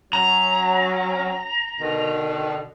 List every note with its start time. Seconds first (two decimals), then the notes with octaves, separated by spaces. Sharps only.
0.13 F#3 C#4 A#5
1.81 B2 D3 D#3